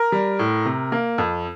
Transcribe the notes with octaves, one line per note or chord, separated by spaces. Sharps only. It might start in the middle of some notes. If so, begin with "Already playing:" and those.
Already playing: A#4
G3
A2
C3
A#3
F2